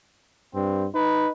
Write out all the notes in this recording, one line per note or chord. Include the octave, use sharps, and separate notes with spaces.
G2 C4
D#4 B4